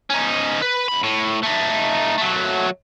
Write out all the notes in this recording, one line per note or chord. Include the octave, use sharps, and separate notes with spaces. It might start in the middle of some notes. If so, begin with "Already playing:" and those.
C#4 D#4
B4
F#2 B5
A2
A3 D#4
F#3 A3